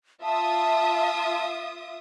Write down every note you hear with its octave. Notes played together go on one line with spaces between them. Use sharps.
F4 E5 A5 D#6